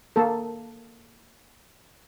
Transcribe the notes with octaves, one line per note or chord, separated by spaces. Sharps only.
A#3 A4